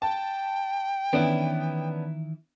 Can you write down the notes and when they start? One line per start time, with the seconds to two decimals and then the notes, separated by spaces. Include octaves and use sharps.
0.02 G5 A5
1.13 D#3 E3 B3 C#4 D4 E4